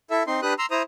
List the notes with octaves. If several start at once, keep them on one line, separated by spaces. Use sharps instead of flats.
E4 A4 E5
C4 D#4 C6
D4 G4 B4 D#6 F#6
A#5 C6 E6
E4 C5 A#5 D#6